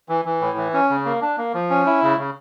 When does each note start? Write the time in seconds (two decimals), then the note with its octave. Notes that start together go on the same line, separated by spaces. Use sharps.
0.09 E3
0.25 E3
0.41 A2
0.57 E3
0.73 C#4
0.90 C#3
1.05 A#3
1.22 D4
1.38 A#3
1.54 F3
1.70 C#4
1.86 E4
2.02 C#3
2.19 C#3